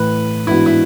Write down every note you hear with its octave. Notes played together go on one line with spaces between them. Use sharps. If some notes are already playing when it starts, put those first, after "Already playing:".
Already playing: A2 E3 A3 B4
G#2 E3 B3 D4 E4 F#4
E4